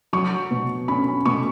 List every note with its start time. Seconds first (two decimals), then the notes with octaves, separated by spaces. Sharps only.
0.13 F#3 C#6
0.51 B2
0.88 C#4 B5
1.26 B2 C#6